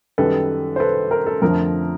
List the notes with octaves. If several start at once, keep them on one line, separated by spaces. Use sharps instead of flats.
F#2 D#3 G3 A4 B4
C5
A4 B4
A#4
A4
F2 D3 F3 A3 A#4